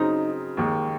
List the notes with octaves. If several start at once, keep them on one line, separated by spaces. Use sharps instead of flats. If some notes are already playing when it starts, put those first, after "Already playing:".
Already playing: C#3 F#3 C4 D#4
D#2 D#3 G#3